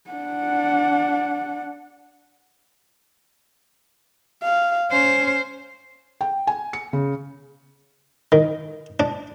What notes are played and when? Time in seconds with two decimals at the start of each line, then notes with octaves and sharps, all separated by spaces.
0.11 D4 F#5
4.43 F5
4.91 C#4 C5
6.21 G5
6.47 G#5
6.73 C#7
6.93 C#3
8.32 D#3
9.00 D4